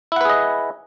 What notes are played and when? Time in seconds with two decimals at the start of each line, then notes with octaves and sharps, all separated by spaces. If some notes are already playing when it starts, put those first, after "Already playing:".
0.12 E4
0.16 F#5
0.21 B4
0.25 G#4
0.30 D#5